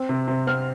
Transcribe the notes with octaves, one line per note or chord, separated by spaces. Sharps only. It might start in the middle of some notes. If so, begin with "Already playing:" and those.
Already playing: C4
C3
C3
C4 F6